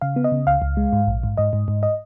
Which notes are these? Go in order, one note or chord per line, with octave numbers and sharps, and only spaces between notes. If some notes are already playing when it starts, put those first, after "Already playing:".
C#3 F5
B3
D#5
C#3
C#2 F5
C#2
G#3
G#2
A#1
G#2
G#2 D#5
G#2
G#2
D#5